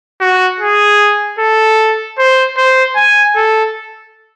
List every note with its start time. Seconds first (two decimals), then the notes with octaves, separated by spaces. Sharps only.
0.21 F#4
0.60 G#4
1.39 A4
2.18 C5
2.57 C5
2.96 G#5
3.36 A4